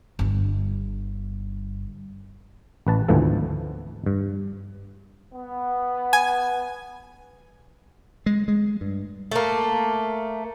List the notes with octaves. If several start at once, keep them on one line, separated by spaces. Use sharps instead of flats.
G1 G2
A1 B4 A5
G#1 D2 B2 E3 F3 A4
G2
B3
G#5
G#3
G#3
G2
A3 A#3